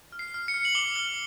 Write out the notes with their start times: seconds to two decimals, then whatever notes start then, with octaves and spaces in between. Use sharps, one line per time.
0.12 F6
0.19 C7
0.34 F6
0.48 C#7
0.54 F6
0.65 F#7
0.75 D6 G7
0.96 F6 G7